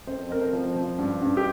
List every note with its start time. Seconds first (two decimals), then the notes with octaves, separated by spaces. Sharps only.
0.07 F2 C5
0.30 F2 A#4
0.41 C5
0.53 F3
0.76 F3
0.99 G2
1.22 G2
1.37 G4